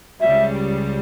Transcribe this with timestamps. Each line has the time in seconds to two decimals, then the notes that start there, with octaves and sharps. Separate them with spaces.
0.21 C#2 C#3 G3 E5